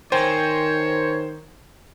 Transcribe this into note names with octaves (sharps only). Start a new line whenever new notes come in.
D#3 A#4 C5 C#5 G5 G#5